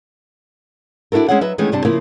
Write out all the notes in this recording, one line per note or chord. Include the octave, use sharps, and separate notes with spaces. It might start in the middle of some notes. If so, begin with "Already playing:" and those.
D4 E4 F#4 A4 A#4
G#3 C#4 E4 G#4 C#5 F#5
F#3 B4 D#5 E5
D#3 E3 G#3 A3 B3 C#4
G2 C3 G3 D4 A5
C#3 F3 A#3 E4 A#4